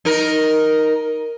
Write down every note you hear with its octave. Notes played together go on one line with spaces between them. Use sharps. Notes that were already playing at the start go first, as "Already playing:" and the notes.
D#4 A#4